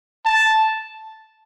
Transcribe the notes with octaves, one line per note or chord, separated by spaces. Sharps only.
A5